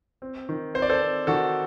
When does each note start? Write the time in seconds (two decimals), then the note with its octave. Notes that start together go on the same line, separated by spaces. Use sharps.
0.22 C4
0.49 D#3
0.74 C4 C5
0.82 D5
0.89 A4 C5
1.01 C4
1.27 D#3 F#4 A4